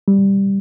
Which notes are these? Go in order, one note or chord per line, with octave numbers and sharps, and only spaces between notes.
G3